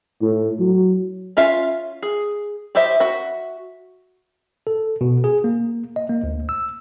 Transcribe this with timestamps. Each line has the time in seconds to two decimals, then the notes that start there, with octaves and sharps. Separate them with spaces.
0.22 A2
0.59 F#3
1.37 C#4 F4 E5 F5
2.03 G#4
2.75 E4 G4 C5 D#5 E5
3.00 F#4 E5
4.67 A4
5.01 B2
5.24 G#4
5.44 A#3
5.96 D#5
6.09 A#3
6.23 D2
6.49 E6